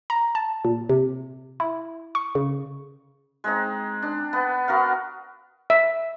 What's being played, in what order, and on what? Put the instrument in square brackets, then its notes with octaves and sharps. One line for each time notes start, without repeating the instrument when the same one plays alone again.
[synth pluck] A#5
A5
A#2
C3
E4
C#6
C#3
[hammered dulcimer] G#3 C4 D#4
D4
B3
B3 F#4 A#4 F5
[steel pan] E5